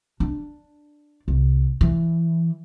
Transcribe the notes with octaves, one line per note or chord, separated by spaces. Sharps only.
D4
C2
E3